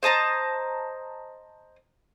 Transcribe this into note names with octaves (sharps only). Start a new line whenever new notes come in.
C5 D#5 A5 A#5